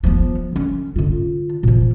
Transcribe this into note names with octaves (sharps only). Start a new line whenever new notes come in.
F3 B3
D3 C#4
D3 F4
A#2 F3